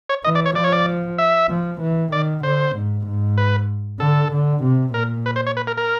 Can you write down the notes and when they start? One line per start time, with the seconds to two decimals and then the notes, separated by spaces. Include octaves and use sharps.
0.09 C#5
0.24 E3 D#5
0.35 D5
0.46 C#5
0.55 F3 D5
0.64 C#5
0.72 D5
1.18 E5
1.49 F3
1.81 E3
2.12 D#3 D5
2.43 D3 C5
2.76 G#2
3.06 G#2
3.38 B4
4.00 D3 A4
4.32 D3
4.63 C3
4.93 A#2 A#4
5.26 B4
5.36 C5
5.47 C#5
5.57 B4
5.67 A#4
5.77 A#4